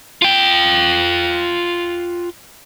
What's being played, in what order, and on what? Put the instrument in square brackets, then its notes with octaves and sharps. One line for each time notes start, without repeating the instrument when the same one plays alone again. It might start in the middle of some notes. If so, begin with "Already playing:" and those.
[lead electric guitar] F4 G5